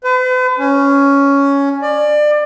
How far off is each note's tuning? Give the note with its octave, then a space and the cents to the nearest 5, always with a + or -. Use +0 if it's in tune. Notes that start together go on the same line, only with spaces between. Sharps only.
B4 +45
C#4 +10
D5 +25